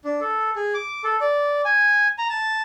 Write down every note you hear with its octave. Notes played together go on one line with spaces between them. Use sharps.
D4
A4
G#4
D6
A4
D5
G#5
A#5
A5